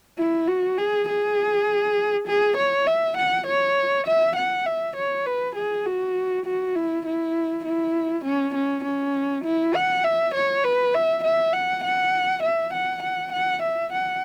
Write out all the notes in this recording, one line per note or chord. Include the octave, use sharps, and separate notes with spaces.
E4
F#4
G#4
G#4
G#4
C#5
E5
F#5
C#5
E5
F#5
E5
C#5
B4
G#4
F#4
F#4
E4
E4
E4
C#4
C#4
C#4
E4
F#5
E5
C#5
B4
E5
E5
F#5
F#5
E5
F#5
F#5
F#5
E5
F#5